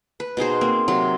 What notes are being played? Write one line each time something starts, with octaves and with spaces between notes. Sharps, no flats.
B4
B2 D#4 G#4 C5
A#3 C4
C3 F#3 C6